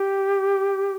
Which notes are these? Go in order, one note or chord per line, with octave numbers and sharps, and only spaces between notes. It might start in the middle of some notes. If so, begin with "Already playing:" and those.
Already playing: G4